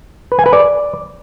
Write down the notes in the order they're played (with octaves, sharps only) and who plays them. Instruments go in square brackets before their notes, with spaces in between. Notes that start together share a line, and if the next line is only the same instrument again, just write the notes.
[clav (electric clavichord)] B4
G#5
B4
D5